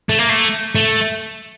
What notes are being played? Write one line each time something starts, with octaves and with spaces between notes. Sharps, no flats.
A3
A#3
A3
A3